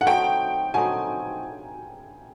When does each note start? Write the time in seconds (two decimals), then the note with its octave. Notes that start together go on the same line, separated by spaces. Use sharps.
0.01 F#5
0.06 F#3 A3 C4 D#4 G5
0.74 F#3 A3 C4 D#4 G#5